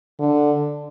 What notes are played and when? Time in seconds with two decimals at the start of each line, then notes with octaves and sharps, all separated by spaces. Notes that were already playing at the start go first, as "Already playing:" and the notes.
0.19 D3